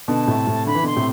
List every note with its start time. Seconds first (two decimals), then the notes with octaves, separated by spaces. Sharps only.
0.08 B2 D3 A5
0.27 A2 C3
0.47 A2 C3
0.66 D3 B5
0.75 E3
0.83 B2 D3 C6
0.96 A2 C3